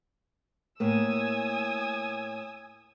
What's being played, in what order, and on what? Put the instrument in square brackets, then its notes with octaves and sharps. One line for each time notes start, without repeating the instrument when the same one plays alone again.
[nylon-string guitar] A2 A#3 [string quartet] G#5 D#6 E6